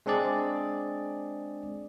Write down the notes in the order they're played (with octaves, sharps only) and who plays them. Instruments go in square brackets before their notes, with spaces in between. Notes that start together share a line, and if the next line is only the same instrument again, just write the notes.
[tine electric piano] G#3 C4 D4 G#4 D5